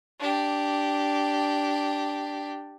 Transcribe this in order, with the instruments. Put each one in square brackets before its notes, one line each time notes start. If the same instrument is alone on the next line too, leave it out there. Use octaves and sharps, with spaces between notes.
[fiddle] D4 G4